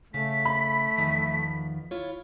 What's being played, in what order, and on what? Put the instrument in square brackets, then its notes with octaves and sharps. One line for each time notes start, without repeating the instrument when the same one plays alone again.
[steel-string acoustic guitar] C#3 F5 [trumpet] A3 [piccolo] B6
[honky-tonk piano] B5
[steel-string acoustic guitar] E2 D#3 F3
E4 F4 C#5